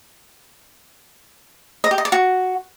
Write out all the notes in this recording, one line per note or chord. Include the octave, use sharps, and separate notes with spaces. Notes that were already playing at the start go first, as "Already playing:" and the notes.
D#5
G4
D#5
D5
F#4